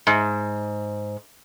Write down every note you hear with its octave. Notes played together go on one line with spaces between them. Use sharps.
G#2